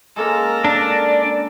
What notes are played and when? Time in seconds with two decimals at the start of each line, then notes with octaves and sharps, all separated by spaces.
0.16 G#3 A#3 C#4 A4 A#4
0.65 D4 D5